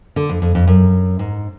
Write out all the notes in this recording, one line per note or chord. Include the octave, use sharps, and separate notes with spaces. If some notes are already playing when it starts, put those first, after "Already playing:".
D3
F2
F2
F2
F#2
G#2